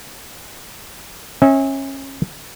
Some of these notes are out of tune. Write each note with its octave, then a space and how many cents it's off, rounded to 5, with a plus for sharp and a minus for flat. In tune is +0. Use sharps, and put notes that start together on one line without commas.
C#4 -30 E5 -35